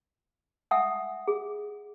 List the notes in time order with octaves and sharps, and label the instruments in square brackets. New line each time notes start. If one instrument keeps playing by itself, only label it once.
[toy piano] E5 F#5 G#5 D#6 E6
G#4